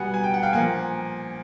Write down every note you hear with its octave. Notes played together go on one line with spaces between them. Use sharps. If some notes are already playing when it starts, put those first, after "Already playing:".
Already playing: B2 G3 B3 F#5 G#5
G#5
G5
F#5
F5 G5
A#2 F3 A#3 F#5 G#5